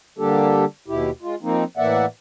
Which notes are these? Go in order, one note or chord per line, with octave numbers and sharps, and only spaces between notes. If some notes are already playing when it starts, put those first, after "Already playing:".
D3 G3 A#3 D4 G4 A4
D#2 B2 E4 G4
G#3 F4
F3 A#3 C4 D#4
A2 E3 A#3 D5 E5 F#5